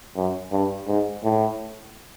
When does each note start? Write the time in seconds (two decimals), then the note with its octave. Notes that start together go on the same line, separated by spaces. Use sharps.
0.16 F#2
0.51 G2
0.88 G#2
1.24 A2